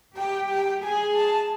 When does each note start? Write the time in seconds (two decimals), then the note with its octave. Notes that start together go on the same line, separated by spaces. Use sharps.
0.16 G4 G5
0.50 G5
0.83 G#4 G#5
1.15 A5